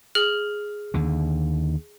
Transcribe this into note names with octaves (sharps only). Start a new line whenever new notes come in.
G#4 F6 F#7
D#2 D3